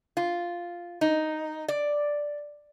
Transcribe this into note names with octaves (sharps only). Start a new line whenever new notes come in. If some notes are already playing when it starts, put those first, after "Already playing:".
F4
D#4
D5